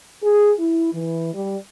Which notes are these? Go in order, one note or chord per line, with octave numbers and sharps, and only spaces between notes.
G#4
E4
E3
G3